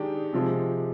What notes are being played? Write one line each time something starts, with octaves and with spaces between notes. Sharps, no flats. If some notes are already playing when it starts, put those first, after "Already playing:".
Already playing: D#3 G#3 D4 G4
C3 F3 G#3